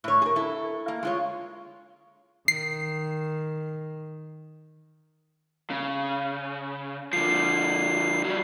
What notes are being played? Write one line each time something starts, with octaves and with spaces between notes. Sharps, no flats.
A2 C#5
G#4 A#4
E4 A4
A#3
G#3 F4 C#5
D#3 C7
C#3
D3 F3 C7
F#3 G3